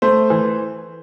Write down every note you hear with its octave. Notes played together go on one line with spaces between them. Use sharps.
A3 C5
E3